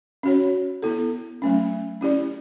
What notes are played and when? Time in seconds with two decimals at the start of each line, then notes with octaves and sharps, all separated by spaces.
0.23 C#4 F#4 C#5
0.82 B3 E4 A4
1.42 F#3 A3 C#4
2.01 C#4 E4 G4 D5